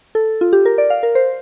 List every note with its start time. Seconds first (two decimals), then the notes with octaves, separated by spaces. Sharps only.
0.15 A4
0.41 F4
0.53 G4
0.65 A#4
0.78 D5
0.90 F5
1.03 A#4
1.15 C5